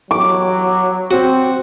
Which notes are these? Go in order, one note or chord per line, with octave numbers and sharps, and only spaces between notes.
F#3 D6
C4 F#4